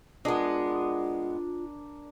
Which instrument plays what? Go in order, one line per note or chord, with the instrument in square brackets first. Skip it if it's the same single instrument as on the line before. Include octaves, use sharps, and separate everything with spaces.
[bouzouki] G#3 B3 [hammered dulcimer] D4 A#4 [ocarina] F4